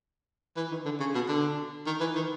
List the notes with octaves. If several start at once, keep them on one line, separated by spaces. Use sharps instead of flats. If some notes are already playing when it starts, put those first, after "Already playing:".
E3
D#3
D3
C#3
B2
D3
D#3
E3
D#3